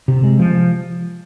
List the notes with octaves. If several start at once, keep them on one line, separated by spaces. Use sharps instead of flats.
C3
G#3
F3